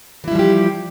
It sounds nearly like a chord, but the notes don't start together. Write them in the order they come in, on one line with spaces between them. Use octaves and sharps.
E3 E4 G3 F3 G4